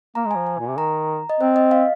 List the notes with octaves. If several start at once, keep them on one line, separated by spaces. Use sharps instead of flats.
A#3 A#5
G#3
F3 G#5
G#5
A#2
C3
D#3 A#5
D#5
C4 C5
D#5
F5